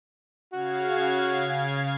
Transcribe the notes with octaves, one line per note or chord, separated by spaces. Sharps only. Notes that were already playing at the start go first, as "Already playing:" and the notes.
C#3 F#4 F5 G#6